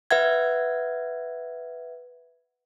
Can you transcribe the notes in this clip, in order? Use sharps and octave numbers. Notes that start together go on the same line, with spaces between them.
B4 E5 F#5 G#6